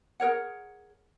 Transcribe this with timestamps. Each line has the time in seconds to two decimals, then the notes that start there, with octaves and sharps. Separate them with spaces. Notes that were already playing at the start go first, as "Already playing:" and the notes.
0.20 G#4 A#4 C#5 F#5